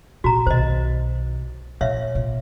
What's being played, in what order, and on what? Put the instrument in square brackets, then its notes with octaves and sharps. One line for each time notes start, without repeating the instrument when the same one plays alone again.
[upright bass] A#2 [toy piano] F#4 A#5
[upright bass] B1 D#3 [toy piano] C5 D#5
[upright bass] A#2 [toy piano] C#5 E5 F5
[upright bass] A#2